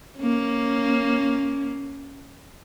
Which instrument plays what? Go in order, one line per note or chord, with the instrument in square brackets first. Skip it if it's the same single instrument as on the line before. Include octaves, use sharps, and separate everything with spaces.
[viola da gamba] A#3 C#4